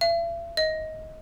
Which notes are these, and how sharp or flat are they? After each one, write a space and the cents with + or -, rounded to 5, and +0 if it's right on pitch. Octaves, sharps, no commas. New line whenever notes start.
E5 +45
D#5 +15